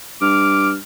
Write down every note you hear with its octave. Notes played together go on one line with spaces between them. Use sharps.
G2 D6 F6